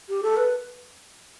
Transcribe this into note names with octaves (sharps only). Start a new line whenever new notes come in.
G4
A4
B4